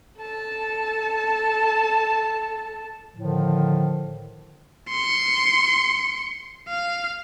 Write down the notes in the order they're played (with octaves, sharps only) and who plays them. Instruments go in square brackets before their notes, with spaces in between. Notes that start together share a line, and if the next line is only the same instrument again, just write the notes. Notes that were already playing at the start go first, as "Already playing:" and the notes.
[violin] A4 A5
[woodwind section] A2 D3 D#3 F3
[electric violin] C6 C#7
F5